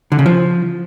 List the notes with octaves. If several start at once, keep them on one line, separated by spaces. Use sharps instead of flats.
D3
C#3
F3